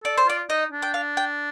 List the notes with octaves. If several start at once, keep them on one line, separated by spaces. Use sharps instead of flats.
A4 D5
C5
F4 D5
D#4 D#5
D4
G5
F5
G5